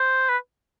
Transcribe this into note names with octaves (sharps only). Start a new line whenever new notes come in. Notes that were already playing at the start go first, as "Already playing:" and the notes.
Already playing: C5
B4